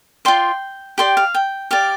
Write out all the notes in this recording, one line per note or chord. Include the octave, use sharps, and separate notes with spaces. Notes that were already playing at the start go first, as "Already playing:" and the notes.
F4 D5 G5 C6
G4 D5 G5 C6
F5
G5
G4 D5 F5